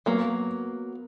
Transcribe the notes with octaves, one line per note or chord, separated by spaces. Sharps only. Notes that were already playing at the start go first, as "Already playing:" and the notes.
F#3 A#3 B3